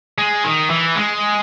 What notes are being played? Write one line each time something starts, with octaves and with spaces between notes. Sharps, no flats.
G#3
D#3
E3
G#3